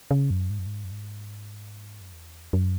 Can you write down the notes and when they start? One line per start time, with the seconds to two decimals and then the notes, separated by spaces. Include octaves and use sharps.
0.11 C#3
0.31 F#2
0.50 G#2
0.59 F#2
0.66 G#2
0.85 F#2
0.91 G#2
2.01 F#2
2.13 E2
2.53 F#2